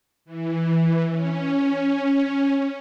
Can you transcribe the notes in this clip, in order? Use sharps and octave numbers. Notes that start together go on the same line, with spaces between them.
E3
C#4